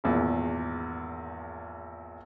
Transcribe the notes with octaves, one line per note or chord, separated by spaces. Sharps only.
G#1 E2 A#2